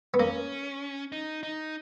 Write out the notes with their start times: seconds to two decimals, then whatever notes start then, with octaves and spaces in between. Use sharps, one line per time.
0.14 B3
0.20 A#3 C#4
1.12 D#4
1.43 D#4